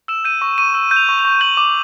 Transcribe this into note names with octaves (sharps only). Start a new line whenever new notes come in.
E6 E7
G6 D#7
C#6
C#6 D#7
E6
G6
F7
C#6
F7
C#6
G6 F#7
D6